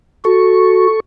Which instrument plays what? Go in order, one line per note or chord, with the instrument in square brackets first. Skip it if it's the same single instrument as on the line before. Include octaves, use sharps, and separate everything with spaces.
[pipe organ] F#4 [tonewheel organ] A4 C#6